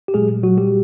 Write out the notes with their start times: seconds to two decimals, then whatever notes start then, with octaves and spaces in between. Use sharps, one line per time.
0.08 G4
0.14 A#2 F#3 G#3 A3 G#4
0.43 F#3 F#4
0.58 G3 G4